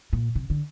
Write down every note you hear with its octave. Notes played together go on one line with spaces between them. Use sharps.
A#2
C3
D3